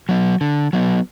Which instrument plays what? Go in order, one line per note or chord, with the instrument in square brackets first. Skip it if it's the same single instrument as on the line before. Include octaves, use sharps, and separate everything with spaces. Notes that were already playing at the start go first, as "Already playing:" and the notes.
[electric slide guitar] F#3 B3
D3
F#3 B3